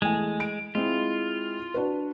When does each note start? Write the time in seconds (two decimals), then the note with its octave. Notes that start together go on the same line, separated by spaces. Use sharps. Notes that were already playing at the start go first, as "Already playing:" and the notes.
0.02 E2 G#3 A3 G#5
0.40 D7
0.75 G#3 C4 E4 F4
1.74 D4 F#4 B4